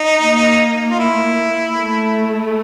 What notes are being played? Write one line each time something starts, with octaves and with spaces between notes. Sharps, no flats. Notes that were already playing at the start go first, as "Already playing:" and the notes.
Already playing: D#4
A#3
F4
E4
A3